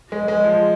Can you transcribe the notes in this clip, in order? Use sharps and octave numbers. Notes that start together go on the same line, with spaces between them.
G#3
G#3
F3